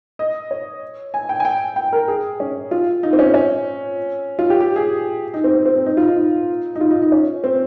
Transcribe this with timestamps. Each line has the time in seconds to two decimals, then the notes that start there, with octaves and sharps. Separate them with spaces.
0.19 D#5
0.51 C#5
1.14 G#5
1.29 G5
1.40 G#5
1.45 G5
1.76 G5
1.93 A#4
2.08 G#4
2.40 C#4
2.71 F4
3.03 D#4
3.13 C4
3.19 C#4
3.34 C#4
4.39 F4
4.50 G4
4.60 G4
4.76 G#4
5.34 D#4
5.44 C4
5.55 C4
5.65 C4
5.76 C4
5.86 D#4
5.97 F4
6.08 D#4
6.76 D#4
6.81 F4
6.91 D#4
7.02 D#4
7.12 C#4
7.44 C4